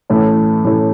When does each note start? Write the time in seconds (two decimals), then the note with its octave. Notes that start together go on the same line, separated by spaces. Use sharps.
0.10 A2 E3 A3 C#4
0.65 A2 E3 A3 C#4